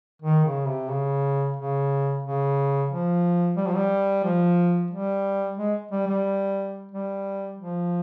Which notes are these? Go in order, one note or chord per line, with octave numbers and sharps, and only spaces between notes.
D#3
C#3
C3
C#3
C#3
C#3
F3
G3
F3
G3
F3
G3
G#3
G3
G3
G3
F3